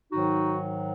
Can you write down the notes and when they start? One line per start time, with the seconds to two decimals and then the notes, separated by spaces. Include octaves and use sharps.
0.12 G#2 D#3 F#3 D#4 F#4